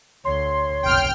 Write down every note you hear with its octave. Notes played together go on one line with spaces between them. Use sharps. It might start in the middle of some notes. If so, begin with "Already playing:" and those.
D2 C#5 C6
F1 B1 G5 F6